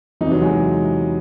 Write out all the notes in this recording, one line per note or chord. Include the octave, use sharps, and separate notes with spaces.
E2 C3 E3 D#4
F#3
G#3